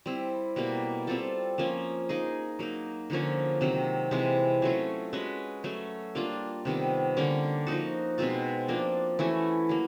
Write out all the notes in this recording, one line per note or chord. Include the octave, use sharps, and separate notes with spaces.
G3 C4 E4
B2 G3 A#3
G3 C4 F4 A4
F3 A#3 C#4
A#3 D#4 G#4
F#3 A#3 D#4
D3 F3 A#3 C#4
C3 D#3 F#3
C3 E3 G#3
F#3 A3 C#4 F4
G#3 C#4 F#4 B4
F#3 A3 C#4
G3 A#3 D4 F4
C3 D#3 G3 B3
D3 G3 A#3 C#4
F3 A#3 D#4 F#4
B2 G#3 C4 F4
F3 A#3 D4
E3 A3 C#4 F#4
F#3 A#3